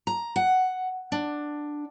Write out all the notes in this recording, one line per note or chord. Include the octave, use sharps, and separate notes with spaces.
A#5
F#5
D4